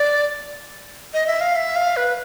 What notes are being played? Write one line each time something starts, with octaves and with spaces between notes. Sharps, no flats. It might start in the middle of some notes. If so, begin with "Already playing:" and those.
Already playing: D5
D#5
E5
F5
E5
F5
B4